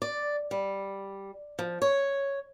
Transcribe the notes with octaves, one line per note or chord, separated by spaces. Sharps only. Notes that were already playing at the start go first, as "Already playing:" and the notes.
D5
G3
F3
C#5